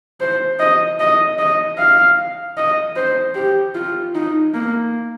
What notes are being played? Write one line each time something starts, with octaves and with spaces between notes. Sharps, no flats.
C5
D#5
D#5
D#5
F5
D#5
C5
G4
F4
D#4
A#3